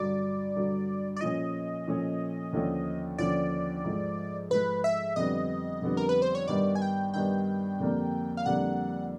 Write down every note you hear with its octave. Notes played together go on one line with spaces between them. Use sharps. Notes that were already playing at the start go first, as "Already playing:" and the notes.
Already playing: G2 D3 F#3 D5
G2 D3 F#3
D5
A#2 F3 A3 C#4 D#5
A#2 F3 A3 C#4
D#2 D3 F3 A3 C#4
D#2 D3 F3 A3 C#4 D5
G#2 F3 A3
G#2 F3 A3 B4
E5
F2 D3 G3 B3 D4 D#5
F2 D3 G3 B3 D4
A#4
B4
C5
C#5
G2 D#3 G3 B3 D4 D5
G#5
G5
G2 D#3 G3 B3 D4 G5
F2 D3 G3 A#3 D4
F5
F2 D3 G3 A#3 D4 F#5